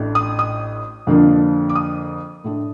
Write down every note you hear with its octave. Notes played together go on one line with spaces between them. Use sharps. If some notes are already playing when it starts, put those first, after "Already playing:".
Already playing: A1 A2 A3 D4
D#6
D#6
F2 D3 F3 A#3 D4
D6
D#6
A2 A3 D4